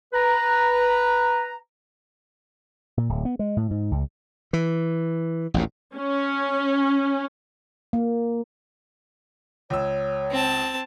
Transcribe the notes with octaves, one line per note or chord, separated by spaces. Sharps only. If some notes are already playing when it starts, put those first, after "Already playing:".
B4 A#5
A#2
D1
B3
G#3
A2
G#2
C#2
E3
A1 D#2 A#2
C#4
A#3
C#2 C#5 E6
C4 A5